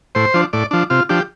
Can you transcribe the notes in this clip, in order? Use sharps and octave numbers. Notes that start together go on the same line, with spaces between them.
A2 C5
F3 D4
A2 D5
F3 D4
C3 F4
F3 D4 G4